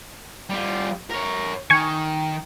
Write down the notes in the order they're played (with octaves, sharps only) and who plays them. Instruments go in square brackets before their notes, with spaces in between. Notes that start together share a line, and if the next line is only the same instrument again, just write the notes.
[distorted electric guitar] G3 F4
A#4 C#5
[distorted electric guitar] D#3 [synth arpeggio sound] G#5 C#6